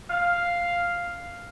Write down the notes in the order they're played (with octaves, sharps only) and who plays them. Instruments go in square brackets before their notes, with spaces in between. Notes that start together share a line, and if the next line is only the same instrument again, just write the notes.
[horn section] F5